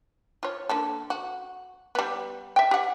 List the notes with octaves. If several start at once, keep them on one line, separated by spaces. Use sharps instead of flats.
F4 C#5
D3 A#3 A4
F#4
G3 B3
E5 G5
G4 F#5